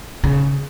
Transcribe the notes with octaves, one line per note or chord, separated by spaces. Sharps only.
C#3